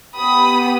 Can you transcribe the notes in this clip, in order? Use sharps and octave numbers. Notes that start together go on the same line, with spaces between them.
B3 G4 B5 D#6